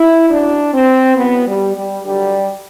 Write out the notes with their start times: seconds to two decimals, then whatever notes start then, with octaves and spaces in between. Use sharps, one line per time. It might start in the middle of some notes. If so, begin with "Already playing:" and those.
Already playing: E4
0.30 F#2 F#3 D4
0.73 C4
1.16 E2 B2 F#3 B3
1.46 G3
1.75 G3
2.03 G2 D3 F#3 G3